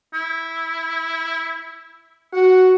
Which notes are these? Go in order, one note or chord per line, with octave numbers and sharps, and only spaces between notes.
E4
F#4 F#5